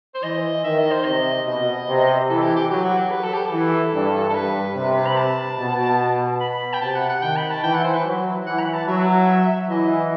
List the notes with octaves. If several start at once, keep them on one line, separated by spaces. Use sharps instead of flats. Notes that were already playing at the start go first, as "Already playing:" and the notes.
C5
E3 D#5
D#3 E5
D#5
C5
C3 D#5
B2 D#5
C3
E3 A4
G4
G4
F#3 G4
F#4
G4
B4
A4
G4
A4
E3
G2
A4
G2 B4
C3
B5
A5
B2
B5
G5
C3 A5
F#5
F#5
D#3 G5
B5
A5
E3 G5
F#5
C5
B4
F#3
E3 F#5
B5
A5
F#3 E5
E3 D#5